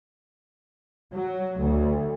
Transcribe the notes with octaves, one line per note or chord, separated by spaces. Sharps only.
F#3
D2